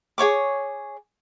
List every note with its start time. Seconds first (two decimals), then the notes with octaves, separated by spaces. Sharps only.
0.18 G#4 C#5 C#6 D6